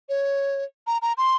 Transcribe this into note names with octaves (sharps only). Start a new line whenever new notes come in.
C#5
A#5
A#5
C6